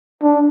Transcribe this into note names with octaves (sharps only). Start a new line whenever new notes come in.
D4